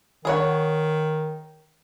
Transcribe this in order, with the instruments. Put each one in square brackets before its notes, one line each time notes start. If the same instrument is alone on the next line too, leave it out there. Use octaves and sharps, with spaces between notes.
[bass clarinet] D#3 [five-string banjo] G#4 C#5 F#5